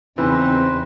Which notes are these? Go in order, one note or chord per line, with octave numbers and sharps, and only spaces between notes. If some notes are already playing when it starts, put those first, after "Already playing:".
E2 C#3 E3 C4 D#4 B4 C5